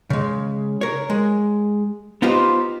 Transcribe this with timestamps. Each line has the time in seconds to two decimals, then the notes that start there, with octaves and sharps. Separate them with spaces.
0.10 C#3 G#3
0.81 A#4 C#5
1.10 G#3
2.22 B3 D#4 F4 G4 C5